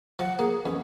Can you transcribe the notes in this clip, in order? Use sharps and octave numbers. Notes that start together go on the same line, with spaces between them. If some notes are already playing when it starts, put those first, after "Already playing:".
F3 F#5
A#3 G#4
E2 C#4